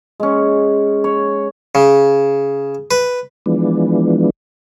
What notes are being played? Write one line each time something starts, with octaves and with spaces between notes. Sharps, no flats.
G#3 C#4
C#5
C#3
B4
E3 F3 G#3 B3 D4